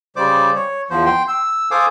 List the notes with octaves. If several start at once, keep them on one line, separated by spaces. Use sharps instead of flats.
C#3 G3 C5 D5 D6
C#5
E2 F3 C5
G5 C6
E6
A4 C5 F5 G#5 D6 D#6